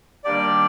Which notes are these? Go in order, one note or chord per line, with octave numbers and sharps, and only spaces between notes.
D#3 G3 A#3 D4 G4 D5